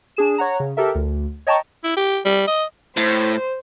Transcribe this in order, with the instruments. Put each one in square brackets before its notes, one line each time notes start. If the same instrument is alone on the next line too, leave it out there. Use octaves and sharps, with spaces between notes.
[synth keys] D4 G#4 E7
C#5 F#5 A#5
C#3
G4 A4 A#4 E5
D2
C#5 D#5 G5 A5 A#5 C#6
[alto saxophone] E4
G4
G3
D#5
[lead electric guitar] A2 [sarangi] C5